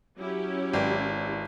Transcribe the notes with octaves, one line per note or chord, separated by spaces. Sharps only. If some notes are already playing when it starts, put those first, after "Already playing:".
F#3 C#4 E4 G4
G#1 B4 D5 G5